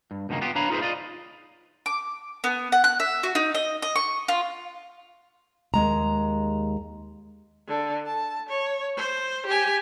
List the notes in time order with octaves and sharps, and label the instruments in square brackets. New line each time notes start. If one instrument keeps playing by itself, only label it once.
[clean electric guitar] G2
C#2 G2 B2 D#3 A#3
B3 F4 G4
D4 B4 C#5 F5 A#5 B5
D#4 F4 G#4 A4 B4 C5
F4 D5 D#5
[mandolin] D6
B3
F#5
F#6
E5
F#4
D#4
D#5
D#5
C#6
F4
[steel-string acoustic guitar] D#2 G#3 A#5
[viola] D3
A5
C#5
C5
G4 G#5